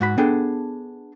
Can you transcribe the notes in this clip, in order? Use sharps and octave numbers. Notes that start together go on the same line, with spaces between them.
G#2 F#4 B5
B3 D4 G#4 A4 G5